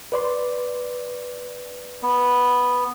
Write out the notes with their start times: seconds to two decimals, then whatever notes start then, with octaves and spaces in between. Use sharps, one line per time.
0.12 B4 D5 C6
2.03 B3